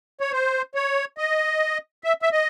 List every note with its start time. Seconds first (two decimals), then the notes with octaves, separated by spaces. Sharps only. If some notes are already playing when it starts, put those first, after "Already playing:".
0.21 C#5
0.32 C5
0.75 C#5
1.18 D#5
2.04 E5
2.22 E5
2.32 D#5